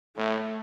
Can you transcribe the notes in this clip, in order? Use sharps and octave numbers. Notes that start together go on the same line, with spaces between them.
A2 A3